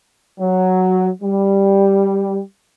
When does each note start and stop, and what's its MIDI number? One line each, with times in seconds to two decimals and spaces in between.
0.39 1.09 54
1.22 2.40 55